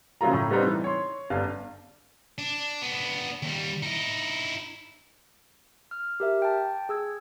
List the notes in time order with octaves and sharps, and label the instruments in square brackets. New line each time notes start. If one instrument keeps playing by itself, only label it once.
[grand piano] C#3 F3 F#3 A#3 F4 A#5
A2
G3 B3 C4 D4 D#4
E3 E6
C#5 C6
G1 D4 F5
[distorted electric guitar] D4
B3 D4
D#2 G3
D#4 E4
[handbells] F6
G4 A#4 E5
G5 A5
G#4 E6 G#6